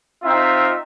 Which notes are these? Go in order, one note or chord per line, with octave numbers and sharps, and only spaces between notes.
C4 D#4 F4 E5